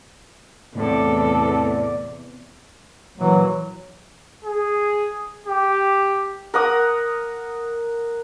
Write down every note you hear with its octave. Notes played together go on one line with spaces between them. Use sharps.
E2 A2 C3 A4 D5
A#2 E3 F#3
G#4
G4
A#4 F#5 D#6